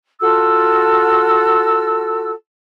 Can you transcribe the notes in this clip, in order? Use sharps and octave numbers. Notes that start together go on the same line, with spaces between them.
F4 F#4 A4 E6